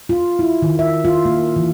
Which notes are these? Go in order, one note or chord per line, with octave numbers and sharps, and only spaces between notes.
F4
E4
D#3
E5
F4
A#3
E3